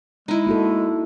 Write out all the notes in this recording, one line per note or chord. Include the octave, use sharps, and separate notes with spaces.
G#3 D#4 E4
A#3 F#4 A4